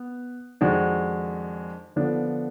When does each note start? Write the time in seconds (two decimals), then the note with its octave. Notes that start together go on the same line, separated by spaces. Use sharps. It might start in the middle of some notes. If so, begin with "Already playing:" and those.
Already playing: B3
0.61 F2 D#3 G#3 D4 F#4
1.96 D3 F3 B3 D4